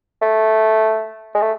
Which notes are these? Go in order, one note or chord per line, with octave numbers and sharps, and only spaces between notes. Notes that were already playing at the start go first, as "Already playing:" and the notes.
A3
G#3
A3